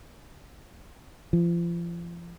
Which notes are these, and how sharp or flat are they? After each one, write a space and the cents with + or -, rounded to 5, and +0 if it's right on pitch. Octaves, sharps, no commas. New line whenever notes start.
F3 -35